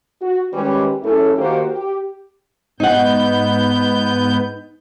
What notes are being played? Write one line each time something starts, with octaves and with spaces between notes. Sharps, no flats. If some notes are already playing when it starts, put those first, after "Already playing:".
F#4
D#3 G3 G#3 C#4 G4 B4
F#2 A3 C#4 E4 G#4 A4
D#3 A#3 F#4 G4 A#4 C5
G4
G#2 B3 D#4 F#5 G6